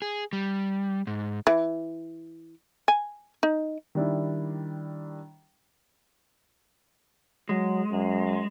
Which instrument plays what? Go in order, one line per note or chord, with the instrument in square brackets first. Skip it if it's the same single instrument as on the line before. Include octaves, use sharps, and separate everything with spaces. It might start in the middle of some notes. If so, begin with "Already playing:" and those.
[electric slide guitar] G#4
G3
G#2
[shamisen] E3
G#5
D#4
[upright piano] D#3 G3 D4 E4
[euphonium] F#3 [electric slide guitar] G#3
[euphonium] F#2